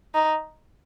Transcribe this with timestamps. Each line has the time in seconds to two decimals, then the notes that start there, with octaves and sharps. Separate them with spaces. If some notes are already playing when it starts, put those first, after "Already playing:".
0.15 D#4